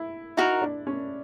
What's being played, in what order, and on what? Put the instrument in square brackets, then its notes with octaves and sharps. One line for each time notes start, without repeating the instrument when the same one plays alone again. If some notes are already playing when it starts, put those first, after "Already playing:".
Already playing: [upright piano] E4
[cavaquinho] D#4 F#4 A#4 [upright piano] E4
[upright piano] D4
C#4